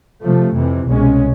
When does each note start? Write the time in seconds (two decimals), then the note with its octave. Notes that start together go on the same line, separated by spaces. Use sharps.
0.23 C3 F3 A3
0.54 F2 C3 E3
0.87 C2 B2 G#3 C#4